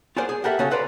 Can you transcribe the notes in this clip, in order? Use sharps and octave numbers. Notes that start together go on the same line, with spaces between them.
F4 F#4 G#4 A#4 C5 D5
G#4
F#4 G4 A4 A#4 E5 F#5
C#3 C#4 F#4 A4
A4 B4 C5 D5 G5 A#5